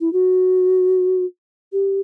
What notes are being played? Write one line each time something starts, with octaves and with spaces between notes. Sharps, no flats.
E4
F#4
G4